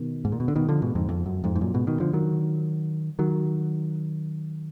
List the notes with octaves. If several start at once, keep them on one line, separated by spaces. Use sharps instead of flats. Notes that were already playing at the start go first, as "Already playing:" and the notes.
Already playing: B2 D#3
G#2
A#2
B2
D3
B2 D#3
D3 F3
G#2 B2
F2 G#2
F2
F#2
F2 G#2
G#2
F#2 A#2
G#2 B2
B2 D#3
D3 F3
D#3 F#3
D#3 F#3